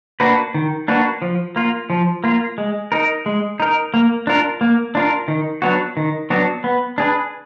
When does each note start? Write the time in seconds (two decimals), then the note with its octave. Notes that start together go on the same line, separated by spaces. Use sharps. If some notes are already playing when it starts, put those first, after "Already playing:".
0.20 A#3 D4 F#4 B4
0.54 D#3
0.88 A#3 D4 F#4 B4
1.22 F3
1.56 A#3 F4
1.90 F3
2.24 A#3 F4
2.58 G#3
2.92 D#4 A#4
3.26 G#3
3.60 D#4 A#4
3.94 A#3
4.27 D4 F4 A#4
4.61 A#3
4.95 D4 F4 A#4
5.28 D#3
5.62 F#3 B3 D4 F#4
5.97 D#3
6.30 F#3 B3 D4 F#4
6.64 B3
6.98 D4 G#4 B4